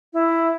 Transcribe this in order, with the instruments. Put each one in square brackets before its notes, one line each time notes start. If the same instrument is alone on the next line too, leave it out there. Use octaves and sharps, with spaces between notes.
[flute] E4